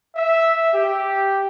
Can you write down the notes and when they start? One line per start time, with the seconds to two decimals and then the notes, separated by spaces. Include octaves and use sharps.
0.16 E5
0.72 G4